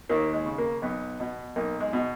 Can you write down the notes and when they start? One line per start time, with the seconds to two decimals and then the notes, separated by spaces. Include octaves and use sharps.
0.09 D#2 A#3
0.33 G#3
0.46 C#3
0.58 A#3
0.82 B1 B3
1.20 B2
1.56 B1 A#3
1.80 G#3
1.93 B2